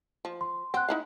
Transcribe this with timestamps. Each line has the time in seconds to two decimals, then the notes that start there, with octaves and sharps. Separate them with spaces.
0.25 F3
0.41 C6
0.74 C4 F#5 F#6
0.89 D#4 E4 F5